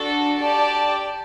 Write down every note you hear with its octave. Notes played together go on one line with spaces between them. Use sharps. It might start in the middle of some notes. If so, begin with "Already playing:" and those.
Already playing: D4 F#4 A4
G4 D5 A5